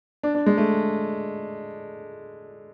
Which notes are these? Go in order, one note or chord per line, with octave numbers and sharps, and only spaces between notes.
D4
D4
G#3
A3